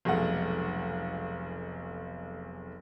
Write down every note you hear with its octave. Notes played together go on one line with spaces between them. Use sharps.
F1 B1 G#3 A3 F#5